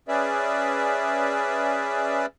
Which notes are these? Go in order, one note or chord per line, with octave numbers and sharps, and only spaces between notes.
C#4 G#4 B4 D5 E5